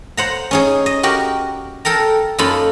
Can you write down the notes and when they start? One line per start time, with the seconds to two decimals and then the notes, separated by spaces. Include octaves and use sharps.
0.17 C5 F#5 A#5
0.51 C#4 D#4 G#4
0.86 D#5
1.03 F#4 G4 A#4
1.85 A4 A#4 G5 A#5
2.38 F#2 A#3 D#4 F4 A4 B5